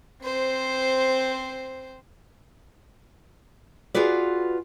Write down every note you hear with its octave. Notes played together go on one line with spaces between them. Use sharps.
C4 C5
F4 F#4 G#4 B4 D5